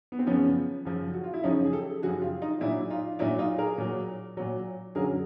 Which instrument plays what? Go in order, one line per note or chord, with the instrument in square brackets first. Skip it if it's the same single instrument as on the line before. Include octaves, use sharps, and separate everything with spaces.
[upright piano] B3
C4
F#2 C#3 F3 B3 C#4
F#2 C#3 F3
F#4
F4
E4
F#2 C#3 F3 C#4 D#4
G#4
G4 A4
F#2 C#3 F3 F#4 G#4
F4 G4
D#4 F4
A#2 F#3 D4 E4
D#4 F4
A#2 F#3 D4 E4
D#4 F4
G#4 A#4
A#2 F#3
A#2 F#3
F#2 D3 F#3 G#4 A#4